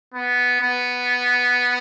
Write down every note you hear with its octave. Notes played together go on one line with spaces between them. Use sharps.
B3
B3